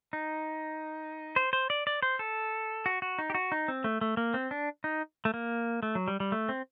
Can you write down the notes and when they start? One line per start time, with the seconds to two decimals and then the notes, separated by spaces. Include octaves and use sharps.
0.13 D#4
1.36 C5
1.53 C5
1.70 D5
1.87 D5
2.03 C5
2.19 A4
2.86 F#4
3.02 F#4
3.18 D#4
3.30 G4
3.35 F#4
3.52 D#4
3.68 C4
3.84 A3
4.01 A3
4.17 A#3
4.34 C4
4.51 D4
4.84 D#4
5.25 A3
5.34 A#3
5.83 A3
5.95 F#3
6.08 G3
6.20 G3
6.32 A3
6.49 C4